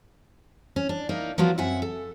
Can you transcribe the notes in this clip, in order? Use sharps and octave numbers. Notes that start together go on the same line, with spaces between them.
C#4
D4
A#3 D#4 E4
F3 F#3 B3 F4 F#4 A#4
F#2 C4 E5 F#5 G#5
A4